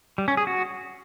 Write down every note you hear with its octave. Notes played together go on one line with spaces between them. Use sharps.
G3
C#4
G#4
F#4